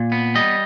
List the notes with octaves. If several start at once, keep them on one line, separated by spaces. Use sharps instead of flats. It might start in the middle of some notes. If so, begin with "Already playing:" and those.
Already playing: A#2
B3
G3 D#5